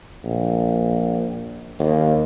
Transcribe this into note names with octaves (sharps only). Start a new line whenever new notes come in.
A#1
D#2